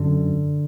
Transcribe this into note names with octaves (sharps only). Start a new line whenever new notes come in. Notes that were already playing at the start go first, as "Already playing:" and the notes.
Already playing: F#2 D3